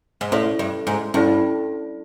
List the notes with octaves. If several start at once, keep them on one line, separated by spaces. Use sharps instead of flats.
G#2
A2 C#4 E4 A4 D5
G2
G#2
G2 C#4 E4 A4 D5